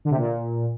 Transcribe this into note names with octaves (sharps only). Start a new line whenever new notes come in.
D3
C3
A#2